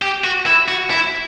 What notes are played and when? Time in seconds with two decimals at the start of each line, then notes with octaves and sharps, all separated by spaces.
0.02 G4
0.24 F#4
0.46 E4
0.68 F#4
0.90 E4